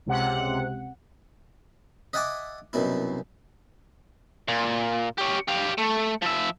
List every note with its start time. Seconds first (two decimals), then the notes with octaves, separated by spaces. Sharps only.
0.06 C#2 C3 F#5
2.13 D#5 E5 F#5 G#5 A5 D6
2.73 C2 F#2 B2 E4
4.48 A#2
5.18 C#4 G4
5.49 G4 F5
5.78 A3
6.22 F3 E5